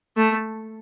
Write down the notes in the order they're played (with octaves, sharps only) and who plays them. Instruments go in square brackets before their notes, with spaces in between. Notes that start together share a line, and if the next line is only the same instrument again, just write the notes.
[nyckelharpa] A3